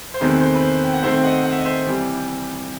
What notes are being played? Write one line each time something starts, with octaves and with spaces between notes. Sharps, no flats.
C5
E2 C3 D#3 A3 C4 B4
C5
B4
C5
G5
F#5
C3 D#3 A3 C4 C5 E5
G5
D#5 F#5
F#5
E5
D#5
C5 E5
C3 E3 G3